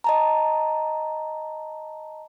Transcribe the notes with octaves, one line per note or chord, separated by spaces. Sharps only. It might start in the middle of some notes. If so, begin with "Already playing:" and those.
D#5 A5 A#5